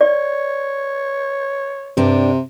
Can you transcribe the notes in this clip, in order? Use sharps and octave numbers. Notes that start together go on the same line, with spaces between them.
C#5 D5
G2 C3 D4